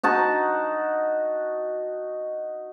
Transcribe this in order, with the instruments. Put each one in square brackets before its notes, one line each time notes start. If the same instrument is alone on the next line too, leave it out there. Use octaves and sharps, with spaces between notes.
[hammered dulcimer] D#4 F#4 A5